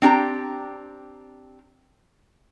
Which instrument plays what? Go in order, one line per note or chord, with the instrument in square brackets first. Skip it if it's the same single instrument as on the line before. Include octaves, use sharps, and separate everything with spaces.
[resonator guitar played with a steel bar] C4 D4 G4 A#5